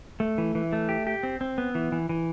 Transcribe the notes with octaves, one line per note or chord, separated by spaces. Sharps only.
A3
E3
E3
A3
G4
G4
C4
C4
B3
E3
E3
E3